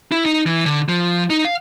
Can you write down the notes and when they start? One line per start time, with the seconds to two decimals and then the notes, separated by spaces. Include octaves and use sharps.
0.12 E4
0.26 D#4
0.46 E3
0.66 D3
0.89 F3
1.30 D#4
1.45 F5